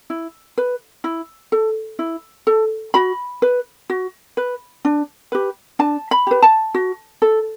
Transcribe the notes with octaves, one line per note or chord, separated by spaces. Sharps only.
E4
B4
E4
A4
E4
A4
F#4 B5
B4
F#4
B4
D4
G4 B4
D4 A5
B5
G4 B4
A5
F#4
A4